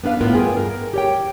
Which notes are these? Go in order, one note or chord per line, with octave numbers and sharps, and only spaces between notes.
B3 D4 B4 F5
A2 B3 F4 A#4
G2 G#4 G5
A#4
G4 C#5 G5